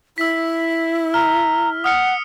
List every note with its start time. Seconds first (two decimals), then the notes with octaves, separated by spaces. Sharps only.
0.18 E4 E6 B6
1.14 A#5 F6
1.84 F#5 D#6 F6 C#7